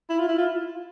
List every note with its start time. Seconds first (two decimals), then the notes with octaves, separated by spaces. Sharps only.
0.09 E4
0.19 F4
0.28 E4
0.38 F4